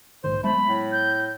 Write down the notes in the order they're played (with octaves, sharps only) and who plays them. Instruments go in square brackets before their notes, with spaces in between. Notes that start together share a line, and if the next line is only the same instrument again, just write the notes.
[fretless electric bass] A#1 G#2 D#3 [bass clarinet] C5
[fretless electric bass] F#3 G#3 B3 [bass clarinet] A3 [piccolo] B5
[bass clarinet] A2
[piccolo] G6